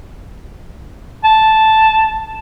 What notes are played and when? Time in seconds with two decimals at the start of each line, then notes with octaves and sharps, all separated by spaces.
1.25 A5